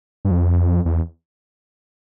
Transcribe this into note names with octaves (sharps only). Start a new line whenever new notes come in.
G2
F2
E2